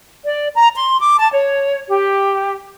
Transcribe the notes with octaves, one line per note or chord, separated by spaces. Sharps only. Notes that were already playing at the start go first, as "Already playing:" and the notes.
D5
A#5
C6
D6
A5
C#5
G4